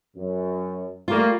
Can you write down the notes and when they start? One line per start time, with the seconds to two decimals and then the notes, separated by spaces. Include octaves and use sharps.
0.16 F#2
1.08 G3 A3 A#3 F4